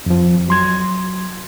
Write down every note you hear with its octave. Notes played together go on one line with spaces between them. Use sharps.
F2 F3
F#3 C6 G#6